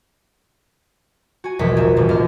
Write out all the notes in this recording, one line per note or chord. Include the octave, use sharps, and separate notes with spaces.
F#4 G#5
D#1 A#1 E2 B2 G#3 B6
F#1 E5
D#1 A1
D#2 F6